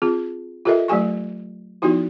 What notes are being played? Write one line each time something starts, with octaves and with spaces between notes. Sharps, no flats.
C4 F4 G#4
F4 G4 A4 A#4 D#5 E5
F#3 A3 G4 G#5 C#6
F3 B3 D#4 E4 F#4 G4